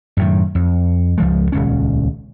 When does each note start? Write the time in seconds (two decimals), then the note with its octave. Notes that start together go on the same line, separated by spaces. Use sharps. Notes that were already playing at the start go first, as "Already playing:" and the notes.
0.17 F#2 A2 D#3
0.55 F2
1.18 C#2 F3 G#3
1.52 D#1 C#2 C#4